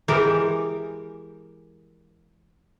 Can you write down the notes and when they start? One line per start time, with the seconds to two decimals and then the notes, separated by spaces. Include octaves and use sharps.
0.08 E3 G#3 G4 A#4